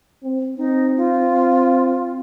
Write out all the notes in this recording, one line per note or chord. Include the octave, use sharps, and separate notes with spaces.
C4
C4 D#4
F4